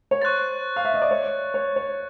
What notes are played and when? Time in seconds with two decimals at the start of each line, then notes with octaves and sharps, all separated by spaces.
0.11 C#5
0.22 C5 C#6 F#6 A6
0.76 F5
0.85 E5
0.94 D#5
1.02 D5
1.11 C#5
1.54 C#5
1.76 C#5